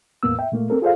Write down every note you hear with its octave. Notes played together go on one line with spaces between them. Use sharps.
E2 A2 A#3 B3 E6
E5 G5
A#2 A3 A#3
C4 A4 A#4
F4 G#4 A4 C5 D5 F5